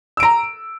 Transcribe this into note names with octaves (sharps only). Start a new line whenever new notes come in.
A#5 E6 D7